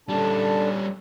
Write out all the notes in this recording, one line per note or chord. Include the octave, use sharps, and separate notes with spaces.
D3 G3 C#4 D4 A5